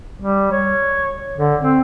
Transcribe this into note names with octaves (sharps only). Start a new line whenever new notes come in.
G3
C#5
D3
C4